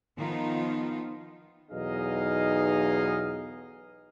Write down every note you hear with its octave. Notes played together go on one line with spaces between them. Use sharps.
D#3 F3 B3 D#4 F4
B1 E2 D#4 G#4 D#5 F5